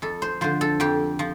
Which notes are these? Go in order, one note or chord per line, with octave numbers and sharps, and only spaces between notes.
F2 A4
C5
D3 F3 C5
A4
F2 G4
F3